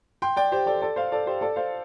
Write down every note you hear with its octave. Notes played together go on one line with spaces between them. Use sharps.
G5 C6
D5 G5
G4 C5
A4 D5
A4 D5
C5 F5
A4 D5
G4 C5
A4 D5
C5 F5